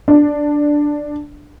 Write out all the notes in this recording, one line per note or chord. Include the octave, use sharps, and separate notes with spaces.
D4